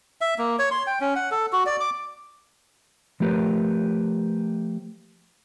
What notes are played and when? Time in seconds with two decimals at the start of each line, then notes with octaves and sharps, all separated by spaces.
0.21 E5
0.38 A#3
0.59 C#5
0.71 C6
0.87 G5
1.01 C#4
1.16 F#5
1.31 A4
1.53 F#4
1.66 D5
1.80 D6
3.20 F3 A3 G4 A#4 B4 C#5